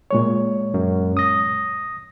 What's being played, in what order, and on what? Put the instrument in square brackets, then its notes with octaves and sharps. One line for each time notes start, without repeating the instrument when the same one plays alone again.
[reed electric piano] A#2 G#3 C#5
[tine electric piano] F#2
D#6 A#6